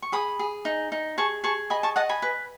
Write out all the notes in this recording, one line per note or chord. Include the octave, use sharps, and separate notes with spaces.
C#6
G#4 B5 D#6
G#4
D#4
D#4
G#4 A5 C#6
G#4 A5 C#6
D#5 G#5 B5
A5 C#6
D#5 F#5 A5
G#5 B5
B4